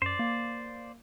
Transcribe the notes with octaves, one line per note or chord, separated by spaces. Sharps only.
F#2 C5 D5
A#3